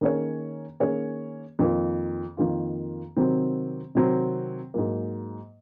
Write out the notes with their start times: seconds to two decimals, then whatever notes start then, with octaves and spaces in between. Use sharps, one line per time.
0.01 D#3 A#3 C#4 G#4 C#5
0.80 D#3 A#3 C#4 G#4 C#5
1.59 F2 D#3 A#3 F4
2.37 F2 D#3 A#3 F4
3.16 C3 D#3 F#3 C4
3.95 C3 D#3 F#3 C4
4.74 G#2 F#3 A#3